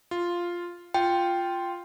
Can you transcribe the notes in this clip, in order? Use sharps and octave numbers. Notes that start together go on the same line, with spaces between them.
F4
F4 G5